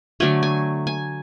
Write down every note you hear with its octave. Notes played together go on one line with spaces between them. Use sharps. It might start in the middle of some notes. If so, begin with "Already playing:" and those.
D3 F#3 A3 G#5
G#5
G#5